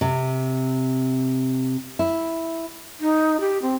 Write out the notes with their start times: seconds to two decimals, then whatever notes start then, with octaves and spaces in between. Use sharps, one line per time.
0.01 C3
1.99 E4
3.00 D#4
3.41 G4
3.62 C4